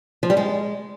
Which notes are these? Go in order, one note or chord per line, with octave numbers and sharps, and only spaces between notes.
F3
G3
G#3